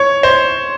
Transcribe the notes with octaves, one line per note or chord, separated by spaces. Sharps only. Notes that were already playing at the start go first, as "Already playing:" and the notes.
Already playing: C#5
C5